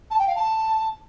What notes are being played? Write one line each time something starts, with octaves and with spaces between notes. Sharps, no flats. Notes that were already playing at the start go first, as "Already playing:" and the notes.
A5
G5
F5
A5